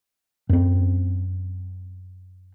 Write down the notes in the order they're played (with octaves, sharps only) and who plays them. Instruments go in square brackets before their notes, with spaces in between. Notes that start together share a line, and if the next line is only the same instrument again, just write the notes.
[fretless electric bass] F#2 C4